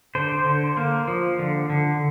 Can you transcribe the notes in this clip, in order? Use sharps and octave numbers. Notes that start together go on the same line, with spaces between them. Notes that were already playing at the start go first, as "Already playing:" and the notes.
D3 C5
D3
A#3
F3
D3
D3